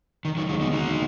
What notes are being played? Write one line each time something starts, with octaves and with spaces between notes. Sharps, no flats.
F1 D#3
D#3 F#3
D#2 D3 D#3 F#3 G#3 D#4
B3 D#4
F1 D#4 F#4